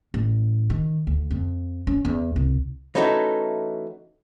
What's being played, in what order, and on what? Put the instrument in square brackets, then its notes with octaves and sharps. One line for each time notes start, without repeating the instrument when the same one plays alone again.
[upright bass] A1
D#3
D2
F2
C#4
E2
C2
[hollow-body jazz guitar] E3 A3 C#4 D#4 F#4 A4